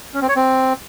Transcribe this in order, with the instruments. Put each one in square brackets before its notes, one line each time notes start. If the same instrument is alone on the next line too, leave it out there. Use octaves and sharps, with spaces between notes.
[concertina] C#4
C4
C#5
C4